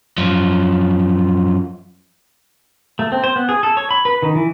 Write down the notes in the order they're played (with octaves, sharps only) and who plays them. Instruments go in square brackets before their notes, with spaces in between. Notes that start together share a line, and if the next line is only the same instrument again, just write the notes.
[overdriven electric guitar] F#2 F3
[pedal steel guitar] A3
C4
C5
B3
G#4
A4
C#5
B5
B4
D#3
E3